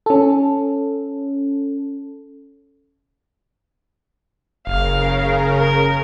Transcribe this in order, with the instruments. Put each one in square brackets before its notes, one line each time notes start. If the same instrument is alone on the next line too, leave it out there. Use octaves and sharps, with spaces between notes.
[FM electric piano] C#4 A4
[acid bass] F#1 [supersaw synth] C#3 A#4 [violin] F5
[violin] A#4